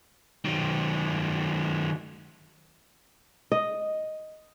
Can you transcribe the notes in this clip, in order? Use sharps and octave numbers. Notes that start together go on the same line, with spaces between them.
D#3 F#3
D#5